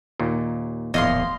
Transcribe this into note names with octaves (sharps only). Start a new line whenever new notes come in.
D#2 A#2
D1 A#1 E2 D#5 F5 C6